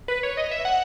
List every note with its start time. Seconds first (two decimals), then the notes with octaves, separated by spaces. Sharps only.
0.08 B4
0.23 C#5
0.37 D#5
0.51 E5
0.65 F#5